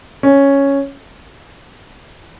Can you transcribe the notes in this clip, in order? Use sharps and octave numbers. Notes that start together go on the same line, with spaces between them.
C#4